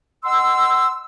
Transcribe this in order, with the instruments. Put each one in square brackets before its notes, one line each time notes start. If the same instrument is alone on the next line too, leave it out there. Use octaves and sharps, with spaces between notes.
[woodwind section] D#5 F#5 C6 E6